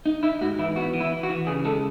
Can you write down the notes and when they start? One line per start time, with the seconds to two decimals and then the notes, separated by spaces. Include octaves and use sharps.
0.06 D#4
0.23 D#4 E4
0.41 G#2 F#4
0.59 E3 E4
0.76 B3 F#4
0.94 E3
1.00 E4
1.12 E3
1.23 F#4
1.29 E3
1.47 C#3 G#4
1.65 G#3 A4